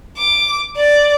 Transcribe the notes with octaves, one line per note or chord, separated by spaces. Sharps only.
D6
D5